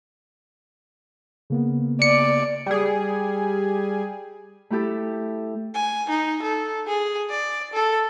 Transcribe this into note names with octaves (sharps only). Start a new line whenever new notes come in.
C#3 A#3 B3
D5 C#7
G3 G#4
A3 E4 G4 A4
G#5
D#4
A4
G#4
D5
A4